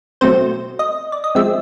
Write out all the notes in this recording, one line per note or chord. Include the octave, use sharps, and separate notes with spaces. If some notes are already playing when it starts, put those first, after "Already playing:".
B2 F#3 A3 C4 C5
D#5
D5
D#5
F3 G#3 C4 E5